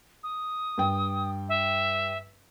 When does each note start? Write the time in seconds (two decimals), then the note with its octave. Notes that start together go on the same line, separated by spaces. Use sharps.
0.23 D#6
0.78 G2 G5
1.49 E5